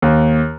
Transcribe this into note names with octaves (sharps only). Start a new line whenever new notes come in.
D#2